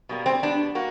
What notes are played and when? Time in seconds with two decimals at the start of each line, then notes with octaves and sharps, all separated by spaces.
0.09 B2 G3 A#3
0.26 C4
0.42 B2 G3 B3 D4
0.75 A#3 F#4